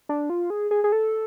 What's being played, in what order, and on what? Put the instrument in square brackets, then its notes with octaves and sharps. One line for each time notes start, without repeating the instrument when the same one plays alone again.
[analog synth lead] D4
F4
G#4
G#4
G#4
A4